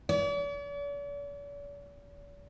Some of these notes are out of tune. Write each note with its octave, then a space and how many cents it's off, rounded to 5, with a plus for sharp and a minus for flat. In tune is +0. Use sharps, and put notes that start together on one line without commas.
D5 -45